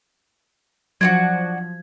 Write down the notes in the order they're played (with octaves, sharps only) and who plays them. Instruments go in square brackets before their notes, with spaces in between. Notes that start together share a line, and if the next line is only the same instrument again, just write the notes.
[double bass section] F3 [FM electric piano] F#3 [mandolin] D4 F4 F#4 [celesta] G#6